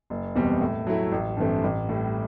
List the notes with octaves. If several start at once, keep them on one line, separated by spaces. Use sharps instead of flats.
F#1
E2 B2 G3 C4
A2
F#3 A3 E4
A1
G2 E3 A3 C4
A1
A2 G3